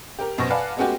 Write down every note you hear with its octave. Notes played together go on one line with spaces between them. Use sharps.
G4 A#4
F#2 B2 C5 C#6 A#6
B4 D5 F5 F#5 G#5 A5
G#3 A3 B3 C#4 F#4 G4